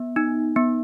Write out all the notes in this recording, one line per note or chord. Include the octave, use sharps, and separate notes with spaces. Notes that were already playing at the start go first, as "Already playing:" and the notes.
Already playing: B3
D#4
B3